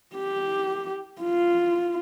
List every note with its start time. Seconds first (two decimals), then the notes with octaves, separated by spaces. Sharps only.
0.16 G4
1.23 F4